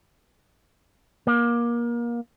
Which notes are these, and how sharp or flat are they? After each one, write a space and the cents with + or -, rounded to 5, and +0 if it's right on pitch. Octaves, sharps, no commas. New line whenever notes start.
A#3 +25